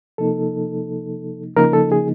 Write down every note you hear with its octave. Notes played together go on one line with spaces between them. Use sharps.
C3 F3 A#3 D#4 A4
C#3 F3 A#3 D#4 A#4
A4
G#4